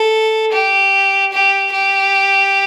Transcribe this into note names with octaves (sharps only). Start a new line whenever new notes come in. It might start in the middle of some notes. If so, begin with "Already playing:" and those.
Already playing: A4
G4
G4
G4